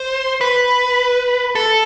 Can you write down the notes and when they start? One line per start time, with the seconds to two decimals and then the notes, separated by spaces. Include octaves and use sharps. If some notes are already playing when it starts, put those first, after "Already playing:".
Already playing: C5
0.41 B4
1.55 A4